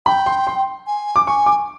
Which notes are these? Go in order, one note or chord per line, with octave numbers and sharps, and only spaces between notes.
G5 B5
C6
C6
G#5
D6
G#5 C#6
D6